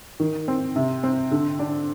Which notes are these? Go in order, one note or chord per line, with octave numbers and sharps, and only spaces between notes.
D#3
C4
C3
C4
D3
D4